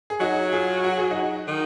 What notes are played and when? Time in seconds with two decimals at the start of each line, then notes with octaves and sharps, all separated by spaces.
0.10 G#4
0.20 F#3 D#4 F#4
0.52 F4 G#4
0.84 F#4
0.97 G#4
1.11 D#4 F#4
1.48 D#3